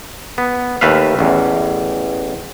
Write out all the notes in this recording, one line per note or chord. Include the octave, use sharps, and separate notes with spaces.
B3
D#2 A3 B4 E5 F5
A1 E2